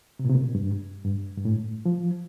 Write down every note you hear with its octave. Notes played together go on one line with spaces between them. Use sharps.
C3
A#2
C3
A#2
G2
G2
G2
A2
F3